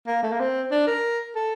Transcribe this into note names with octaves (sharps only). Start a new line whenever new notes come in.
A#3
A3
A#3
C4
D4
A#4
A4